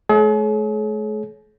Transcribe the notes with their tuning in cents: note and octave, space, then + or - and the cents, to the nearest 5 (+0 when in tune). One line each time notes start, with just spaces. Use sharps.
A3 -40 G#4 +45 C#5 +0